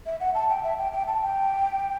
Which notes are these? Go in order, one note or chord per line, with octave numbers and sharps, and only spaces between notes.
E5
F#5
A5
G5
E5
G5
G5
A5
G5